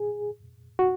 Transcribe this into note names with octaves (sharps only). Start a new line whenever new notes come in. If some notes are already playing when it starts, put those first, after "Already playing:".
Already playing: G#4
F#4